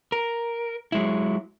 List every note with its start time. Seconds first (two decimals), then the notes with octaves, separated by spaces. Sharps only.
0.12 A#4
0.92 F#3 G#3 E4